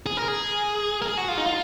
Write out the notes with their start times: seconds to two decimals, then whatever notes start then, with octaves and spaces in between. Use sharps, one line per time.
0.06 G#4
0.17 A#4
0.28 G#4
1.02 A#4
1.06 G#4
1.18 F#4
1.28 F4
1.38 D#4
1.46 F4